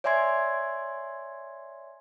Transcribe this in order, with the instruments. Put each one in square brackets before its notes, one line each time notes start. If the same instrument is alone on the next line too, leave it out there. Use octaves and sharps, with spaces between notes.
[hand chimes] C#5 D5 E5 G#5 C6 G#6